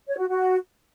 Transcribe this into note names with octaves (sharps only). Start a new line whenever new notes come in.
C#5
F#4
F#4